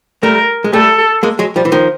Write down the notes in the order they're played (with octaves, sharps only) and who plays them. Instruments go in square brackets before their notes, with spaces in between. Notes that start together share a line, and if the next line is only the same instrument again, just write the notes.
[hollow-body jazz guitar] G3 A3 [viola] A#4
[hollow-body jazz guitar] G#3
[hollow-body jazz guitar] G3 A3 [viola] A4
[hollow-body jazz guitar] G#3 A#3
F#3 G#3
F3 G3
E3
D#3 F3